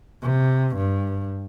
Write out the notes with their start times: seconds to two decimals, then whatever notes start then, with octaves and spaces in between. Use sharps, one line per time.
0.22 C3
0.77 G2